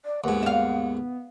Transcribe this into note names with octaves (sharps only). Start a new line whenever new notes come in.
D5
D#2 G#2 B3 F#5
E5 F5